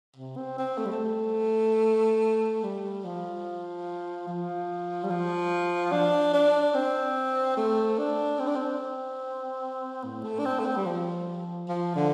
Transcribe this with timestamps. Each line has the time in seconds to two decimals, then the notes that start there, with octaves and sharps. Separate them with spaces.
0.17 C3
0.37 C4
0.58 C4
0.78 A3
0.85 G3
0.92 A3
2.63 G3
3.05 F3
4.28 F3
5.04 G3
5.10 F3
5.92 D4
6.34 D4
6.75 C4
7.57 A3
7.98 D4
8.39 C4
8.48 D4
8.56 C4
10.04 A2
10.24 A3
10.39 D4
10.45 C4
10.60 A3
10.66 C4
10.77 G3
10.86 F3
11.69 F3
11.96 D3